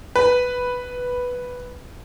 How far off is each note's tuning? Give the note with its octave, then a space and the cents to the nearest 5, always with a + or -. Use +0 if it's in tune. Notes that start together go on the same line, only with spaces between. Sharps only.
B4 +0